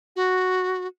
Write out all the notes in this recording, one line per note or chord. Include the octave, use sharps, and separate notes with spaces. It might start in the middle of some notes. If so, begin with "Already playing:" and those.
F#4